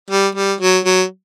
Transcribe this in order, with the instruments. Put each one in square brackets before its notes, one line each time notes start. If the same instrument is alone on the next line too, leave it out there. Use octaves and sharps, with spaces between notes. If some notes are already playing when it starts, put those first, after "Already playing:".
[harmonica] G3
G3
F#3
F#3